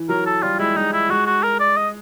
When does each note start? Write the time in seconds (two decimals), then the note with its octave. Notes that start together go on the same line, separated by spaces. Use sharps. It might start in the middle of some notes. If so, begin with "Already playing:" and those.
Already playing: E3
0.09 F#3 A#4
0.26 A4
0.43 G3 F4
0.59 G#3 E4
0.76 G#3 D#4
0.93 E4
1.09 G#3 F#4
1.26 F#4
1.43 A#4
1.60 D5
1.77 D#5